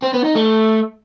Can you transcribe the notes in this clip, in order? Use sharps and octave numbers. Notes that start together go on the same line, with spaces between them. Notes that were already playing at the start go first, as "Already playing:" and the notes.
C4
B3
D#4
A3